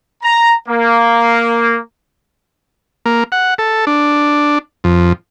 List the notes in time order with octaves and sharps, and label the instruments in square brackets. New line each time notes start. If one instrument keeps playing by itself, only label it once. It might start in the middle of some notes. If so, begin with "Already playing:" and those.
[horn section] A#5
A#3
[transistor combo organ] A#3
F#5
A4
D4
F2